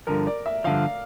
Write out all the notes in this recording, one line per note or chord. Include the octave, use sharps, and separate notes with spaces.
G2 D3 F3 A#4
D5
E5
G2 D3 F3 F5